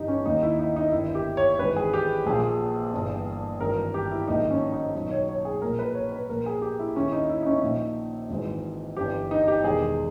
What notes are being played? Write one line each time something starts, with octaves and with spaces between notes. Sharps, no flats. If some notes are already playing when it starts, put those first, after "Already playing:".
Already playing: G1 G2 E3 D#4 G4
C#4
D#2 D#3 D#4
E4
D#4
D#4
G1 G2 D#3 E4
G4
C#5
G#1 G#2 E3 B4
G#4
G4
A#1 A#2 G#4
G1 G2 E3
G#1 G2 E3 A#4
G4
E4
A#1 G#2 D#3 D#4
C#4
D#4
B1 B2 D#4
C#5
C#5
G#4
A#1 A#2 A#4
B4
C#5
B4
A#1 A#2 A#4
G#4
G4
E4
D#2 D#3 C#4
E4
D#4
E4
D#4
C#4
A#1 A#2 D#4
G#1 G#2 E3
G1 G2 E3 G4
D#4
G4
E1 E2 D#3 G#4